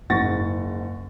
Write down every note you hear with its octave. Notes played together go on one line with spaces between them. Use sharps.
F#1 G#2 F#5 C#6 A6 A#6